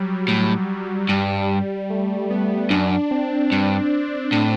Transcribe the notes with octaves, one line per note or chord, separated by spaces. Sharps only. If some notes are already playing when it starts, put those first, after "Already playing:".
Already playing: F#3 G3
A2
G2
A3
B3
F#2 D4
C4
G2
A2